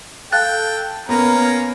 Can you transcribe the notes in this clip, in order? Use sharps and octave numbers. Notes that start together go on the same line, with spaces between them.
A4 F5 G5 F#6 A6
A#3 B3 C#4 A#5